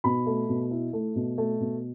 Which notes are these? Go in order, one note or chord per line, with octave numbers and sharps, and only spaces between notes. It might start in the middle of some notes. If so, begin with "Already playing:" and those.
B2 B5
A3
B2
E4
A3
B2
A3
B2